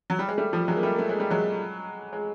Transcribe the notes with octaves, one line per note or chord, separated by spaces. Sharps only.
F#3
G3
G#3
G3 A3
F3 G3
F#3 G#3
A#3
G3 A3
A3
G#3
G3
F#3 G#3
G#3